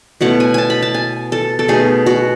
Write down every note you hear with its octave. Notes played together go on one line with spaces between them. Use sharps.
B2 A3 C#4 E4 F#5
G#5
G#5 A5
B5
A5
G#5
A4
A4
B2 A3 D#4 G#4
F#4